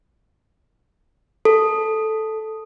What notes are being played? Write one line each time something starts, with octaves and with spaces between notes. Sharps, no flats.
A4